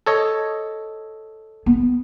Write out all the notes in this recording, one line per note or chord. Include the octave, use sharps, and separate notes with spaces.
A4 C#5 D#5
B3